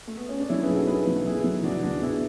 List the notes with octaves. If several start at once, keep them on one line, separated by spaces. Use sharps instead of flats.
A3
B3
C#4
D4
F#3 C#4 E4
G#4 B4
B1
F#4 A4
C#4 G#4 B4
F#3
B3 E4 G#4
F#3
F#3 D4 F#4
E4
D2 D4 F#4
B3 E4 G#4